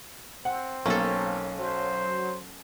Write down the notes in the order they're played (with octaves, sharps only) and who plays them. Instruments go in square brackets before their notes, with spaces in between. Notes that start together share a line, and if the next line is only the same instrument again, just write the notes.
[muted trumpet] C4 [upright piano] F#5
[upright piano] B1 [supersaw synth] A#3 [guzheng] C#4 A4
[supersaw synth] F#3 [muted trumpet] C5